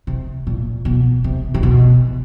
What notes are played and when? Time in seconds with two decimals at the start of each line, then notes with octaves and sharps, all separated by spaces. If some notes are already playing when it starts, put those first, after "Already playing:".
0.07 C3
0.47 A#2
0.85 B2
1.24 C3
1.54 C3
1.63 B2